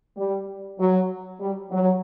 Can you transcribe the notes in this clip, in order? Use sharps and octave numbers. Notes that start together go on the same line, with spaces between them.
G3
F#3
G3
F#3